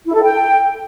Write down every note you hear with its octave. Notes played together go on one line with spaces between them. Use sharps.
E4
A4
G5